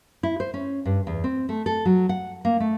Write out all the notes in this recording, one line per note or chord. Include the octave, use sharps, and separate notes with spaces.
E4
C5
C#4
G2
E2
C4
A3
A4
F#3
F#5
A#3
A3